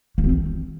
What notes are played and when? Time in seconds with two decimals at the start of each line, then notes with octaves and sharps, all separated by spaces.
0.18 A#3
0.24 C4
0.30 D#3